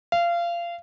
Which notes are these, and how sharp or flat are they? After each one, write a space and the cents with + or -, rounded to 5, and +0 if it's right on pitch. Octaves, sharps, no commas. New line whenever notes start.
F5 -25